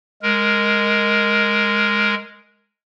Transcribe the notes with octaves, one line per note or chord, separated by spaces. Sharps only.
G#3 A#4